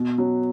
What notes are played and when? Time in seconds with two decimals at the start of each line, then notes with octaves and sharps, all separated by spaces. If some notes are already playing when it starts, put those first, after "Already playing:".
Already playing: B2
0.18 F#3